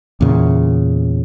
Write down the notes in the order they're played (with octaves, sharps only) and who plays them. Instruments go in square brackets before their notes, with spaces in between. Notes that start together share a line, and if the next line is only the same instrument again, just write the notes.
[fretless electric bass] E2 A#2 C#3